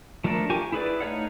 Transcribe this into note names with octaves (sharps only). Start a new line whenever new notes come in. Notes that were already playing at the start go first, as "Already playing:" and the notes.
F3 A3 D4 A4 A#4
F4 G4 G#5 C#6
E4 G#4 B4 D5
A3 D#4 C#5 F5 F#5